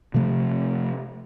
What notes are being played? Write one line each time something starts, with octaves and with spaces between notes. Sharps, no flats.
C3 F3 A3